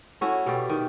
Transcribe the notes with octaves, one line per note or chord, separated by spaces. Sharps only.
A3 C#4 E4 F#4
B2 A3 G4 D5
D#3